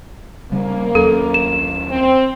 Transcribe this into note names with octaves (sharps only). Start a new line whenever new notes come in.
C#3 G3 A#3 C#4
D#2 F#3 C#4 A4
E7
C4